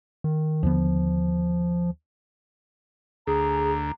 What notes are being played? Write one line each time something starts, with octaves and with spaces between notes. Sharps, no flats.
D#3
D#2 D3 F3 B3
D2 G#4 A#5